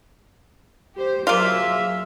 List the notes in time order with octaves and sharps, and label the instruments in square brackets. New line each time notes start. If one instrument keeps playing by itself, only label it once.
[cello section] G4 C5
[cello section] F#3 G#4 E5 [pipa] A#3 F4